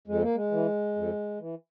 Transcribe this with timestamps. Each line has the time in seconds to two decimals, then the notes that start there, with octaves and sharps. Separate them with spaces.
0.07 F2 G#3
0.22 A#3
0.35 G#3
0.51 E3
0.95 F2
1.40 E3